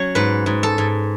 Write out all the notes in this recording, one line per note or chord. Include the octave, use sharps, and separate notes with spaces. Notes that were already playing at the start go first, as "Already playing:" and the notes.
Already playing: F#3 C#4 C#5
G#2 B4
G#2
A4
G#2